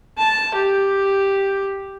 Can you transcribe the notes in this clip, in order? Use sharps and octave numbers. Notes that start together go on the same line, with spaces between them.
A5
G4